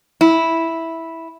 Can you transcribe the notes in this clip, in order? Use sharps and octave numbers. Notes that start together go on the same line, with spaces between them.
E4